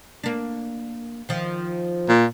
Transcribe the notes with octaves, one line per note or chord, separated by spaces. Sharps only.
A#3 D4
D#3 F3
A#2